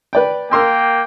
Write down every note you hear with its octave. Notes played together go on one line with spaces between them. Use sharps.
B4 D5 G5
A#3 A#4 G5 C6 E6